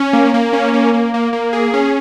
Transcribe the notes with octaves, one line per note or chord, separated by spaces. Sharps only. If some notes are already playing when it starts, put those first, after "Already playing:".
Already playing: C#4
A#3
A#3
C#4
A#3
A#3
A#3
A#3
G#4
C#4